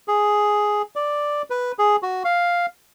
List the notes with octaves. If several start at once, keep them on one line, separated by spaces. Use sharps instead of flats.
G#4
D5
B4
G#4
F#4
F5